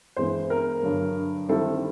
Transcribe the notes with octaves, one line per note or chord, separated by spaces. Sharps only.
G2 E3 G#3 B3 C5
A#4
G2 D3 F#3
D#3 G3 C4 E4 A4